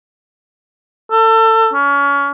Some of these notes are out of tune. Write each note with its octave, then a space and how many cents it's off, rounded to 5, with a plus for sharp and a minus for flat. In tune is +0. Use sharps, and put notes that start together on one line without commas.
A4 +30
C#4 +30